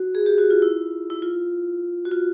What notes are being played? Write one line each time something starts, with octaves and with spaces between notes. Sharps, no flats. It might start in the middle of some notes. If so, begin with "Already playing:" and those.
Already playing: F#4
G#4
G4
F#4
F4
E4
E4
F4
F#4
F4